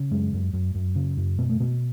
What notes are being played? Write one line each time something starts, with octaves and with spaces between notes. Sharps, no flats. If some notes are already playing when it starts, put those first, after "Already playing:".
Already playing: C#3
F#2 G#3
F#2
F#2
F#2
C#3
F#2
B2 B3
A3
B2 B3